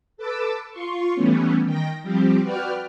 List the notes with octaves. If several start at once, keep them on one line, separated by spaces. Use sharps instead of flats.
A4 B4 A5 D6 E6
F4 C6 C#6
E3 G3 A3 B3 C#4
D#3 G5 A#6
F3 G3 C4 G4
F#4 B4 D5 G5 F6